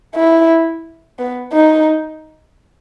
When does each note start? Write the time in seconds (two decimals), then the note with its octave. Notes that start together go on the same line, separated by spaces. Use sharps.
0.15 E4
1.19 B3
1.53 D#4